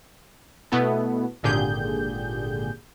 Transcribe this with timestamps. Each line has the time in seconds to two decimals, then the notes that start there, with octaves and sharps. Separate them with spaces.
0.72 B2 A3 B3 E4 A4
1.43 G#1 A#2 D3 G4 G#4 G6